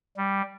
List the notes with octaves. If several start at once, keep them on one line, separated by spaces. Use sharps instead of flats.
G3